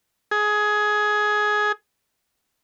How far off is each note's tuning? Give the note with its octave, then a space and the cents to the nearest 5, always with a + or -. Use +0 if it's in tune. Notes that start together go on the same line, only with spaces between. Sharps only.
G#4 +15